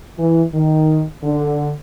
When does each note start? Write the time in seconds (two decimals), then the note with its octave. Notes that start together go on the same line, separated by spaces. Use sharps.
0.19 E3
0.54 D#3
1.23 D3